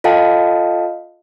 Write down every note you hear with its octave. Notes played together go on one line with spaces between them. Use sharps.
F4 A4 D#5 F5 G5 A5